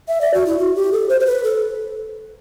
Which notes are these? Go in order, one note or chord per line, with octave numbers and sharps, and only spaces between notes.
E5
D5
F#4
E4
F#4
G4
A4
C5
C5
B4
A4